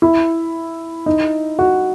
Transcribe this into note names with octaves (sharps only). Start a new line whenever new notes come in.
E4
D#4
F#4